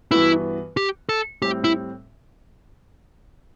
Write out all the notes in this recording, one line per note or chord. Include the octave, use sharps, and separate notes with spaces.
G2 E3 B3 E4 F#4 B4
G4
A4
A2 G3 C4 G4
E4